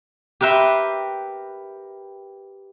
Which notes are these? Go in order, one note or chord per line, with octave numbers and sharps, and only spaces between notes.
G4 A#4 B4 E5 C6